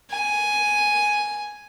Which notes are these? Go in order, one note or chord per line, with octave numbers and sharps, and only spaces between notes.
G#5